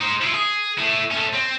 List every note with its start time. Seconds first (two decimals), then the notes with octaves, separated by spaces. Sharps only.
0.01 D#4 C5
0.22 E4 F4
0.34 G#4
0.78 A3 E4
1.11 A3 C#4
1.33 C4